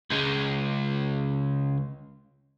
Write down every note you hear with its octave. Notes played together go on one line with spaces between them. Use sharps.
C#2 G#3